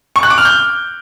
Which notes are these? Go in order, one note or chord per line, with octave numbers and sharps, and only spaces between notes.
C#6
F#6
D6
F6
G6